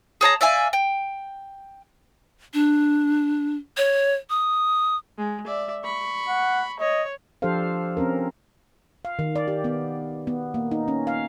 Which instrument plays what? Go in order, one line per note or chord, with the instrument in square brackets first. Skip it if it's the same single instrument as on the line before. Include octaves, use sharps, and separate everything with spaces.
[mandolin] G#4 C#5 A5 A#5
D5 E5 F5 G#5
G5
[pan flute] D4
C#5
D#6
[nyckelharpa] G#3
D5 E5
B5 C#6
[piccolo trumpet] F#5
[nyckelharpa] C#5 [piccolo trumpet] D#5
[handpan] F3 D4 G4 A4 C5 F5
C4 C#4 A#4
F5
D#3
D5
G4
B3
B3
A#3
D#4
C#4
F5